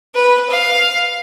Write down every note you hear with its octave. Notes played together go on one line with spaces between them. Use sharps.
B4
F5